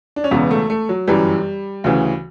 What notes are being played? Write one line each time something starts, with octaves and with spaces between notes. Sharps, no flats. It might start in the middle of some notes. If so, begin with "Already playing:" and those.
D4
C#4
E1 E2 C#3 B3
A3
A3
F#3
G1 F#2 E3 G3
D2 C#3 E3